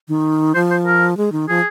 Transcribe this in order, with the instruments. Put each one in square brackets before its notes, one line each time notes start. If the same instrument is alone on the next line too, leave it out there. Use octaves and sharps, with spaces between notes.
[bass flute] D#3
[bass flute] F3 [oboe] C5
[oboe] C5
A#4
[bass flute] G#3
D#3
[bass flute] F3 [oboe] G#4